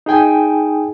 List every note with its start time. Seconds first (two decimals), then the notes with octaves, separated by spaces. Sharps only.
0.06 D#4 G#4 G5 G#5